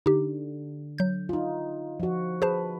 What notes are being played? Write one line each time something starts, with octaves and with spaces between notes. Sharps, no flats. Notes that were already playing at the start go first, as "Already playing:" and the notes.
D3 D#4 G4
F#3 G6
D#4 F4
F3 F#4
G#4 B4 C5 A5